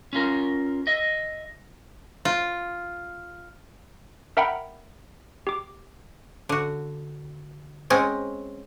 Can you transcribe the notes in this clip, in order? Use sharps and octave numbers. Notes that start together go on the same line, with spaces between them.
C#4 F4 A#4
D#5 E5
F4
A#4 E5 F#5 G5 A#5 B5
G4 D6
D3 F#4
G#3 C4 C#4